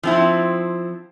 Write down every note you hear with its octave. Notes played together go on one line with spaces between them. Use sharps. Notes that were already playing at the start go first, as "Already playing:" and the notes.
F3 C4 E4